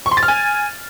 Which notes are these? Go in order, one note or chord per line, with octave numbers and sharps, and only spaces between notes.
C#6
C6
A6
F6
G#5